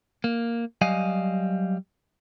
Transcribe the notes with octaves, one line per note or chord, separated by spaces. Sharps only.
A#3
F#3 G3 D#5 F5 G#5